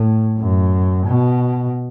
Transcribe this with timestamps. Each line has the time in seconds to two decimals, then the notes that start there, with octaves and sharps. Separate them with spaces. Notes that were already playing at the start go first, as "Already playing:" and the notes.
Already playing: A2
0.38 F#2
1.06 B2